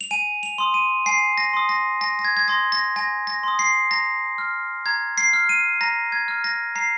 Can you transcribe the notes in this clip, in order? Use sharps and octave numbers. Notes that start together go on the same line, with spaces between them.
F7
G#5 D#7
F7
C6 D#6
D#7
G#5 C7
A#6
C6 D#6
A#6
G#5 A#6
A#6
G#6
G#6
C6 D#6 A#6
A#6
G#5 A#6
A#6
C6 D#6
C7
A#5 A#6
F6
A#5 G#6
C7
F6
D#7
A#5 A#6
G#6
F6
A#6
A#5 C7